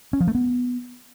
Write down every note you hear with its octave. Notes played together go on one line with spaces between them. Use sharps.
C#4
F3
A3
B3